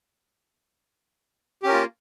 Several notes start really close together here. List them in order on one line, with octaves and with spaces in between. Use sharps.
G4 C#4 A#4 F4 A#3